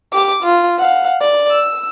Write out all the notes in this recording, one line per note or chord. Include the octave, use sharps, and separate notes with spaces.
G4 D6
F4
F5 F#5
D5
E6